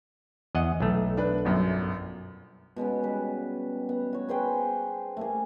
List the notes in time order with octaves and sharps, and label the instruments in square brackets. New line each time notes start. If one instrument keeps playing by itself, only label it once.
[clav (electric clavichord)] E2 D#5 F#5
B1 A3
[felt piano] D4 B4
G1 F#2
[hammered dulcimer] B2 G#3 B3 C#4
G3 B4
B3
F#4 C#5
G#4 B4 C5 G5
A3 A#3 G#4